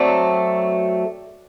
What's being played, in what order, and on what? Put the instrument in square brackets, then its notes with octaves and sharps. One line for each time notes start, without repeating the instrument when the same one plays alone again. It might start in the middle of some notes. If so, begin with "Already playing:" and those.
Already playing: [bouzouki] F#3 A3 C4 D5